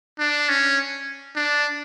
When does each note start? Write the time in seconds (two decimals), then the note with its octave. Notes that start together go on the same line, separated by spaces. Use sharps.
0.19 D4
0.49 C#4
1.36 D4